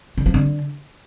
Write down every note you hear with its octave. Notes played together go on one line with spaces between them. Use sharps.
D3
F3
D3